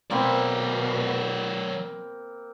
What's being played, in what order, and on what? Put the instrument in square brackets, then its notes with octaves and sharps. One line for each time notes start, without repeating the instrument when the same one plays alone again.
[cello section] B2 [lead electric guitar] F#3 D5 [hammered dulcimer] A#3 C4 B5